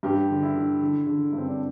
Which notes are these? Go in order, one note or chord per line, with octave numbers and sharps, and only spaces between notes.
G2 G4
D3
E4
D3
D3
D3
G2 C4
D4